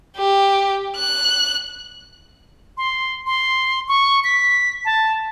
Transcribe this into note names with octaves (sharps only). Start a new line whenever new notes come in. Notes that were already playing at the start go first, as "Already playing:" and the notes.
G4
F#6
C6
C6
C#6
B6
A5